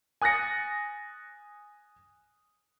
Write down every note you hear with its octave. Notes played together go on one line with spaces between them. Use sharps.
G#5 D#6 F#6 A6 A#6 C#7